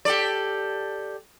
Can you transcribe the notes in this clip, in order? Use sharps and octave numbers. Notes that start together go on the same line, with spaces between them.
G4 A4 D5